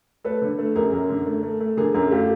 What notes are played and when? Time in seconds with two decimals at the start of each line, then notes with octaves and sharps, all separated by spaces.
0.24 A3 A4 B4
0.42 D3
0.58 A3
0.76 F#2 G#4 A#4
0.92 F#2
1.09 D3
1.26 A3
1.43 A3
1.60 A3
1.77 D3 G#4 A#4
1.94 F#2 G#4 A#4
2.11 A3 F4 G4